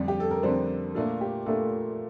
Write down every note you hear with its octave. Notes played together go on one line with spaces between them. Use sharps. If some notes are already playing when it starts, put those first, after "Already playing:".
Already playing: F2 D3 G3 D4 D5
G4
A4
A#4
F2 D3 G3 D4 C5
A#2 A3 D4 F4 A4
G4
A#2 A3 D4 F4 A4